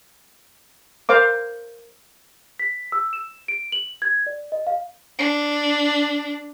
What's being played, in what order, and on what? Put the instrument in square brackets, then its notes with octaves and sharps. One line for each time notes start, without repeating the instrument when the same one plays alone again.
[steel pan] A#4 C5 F5 D6
[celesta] B6
E6
E7
D7
F#7
G#6
D5
D#5
F5
[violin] D4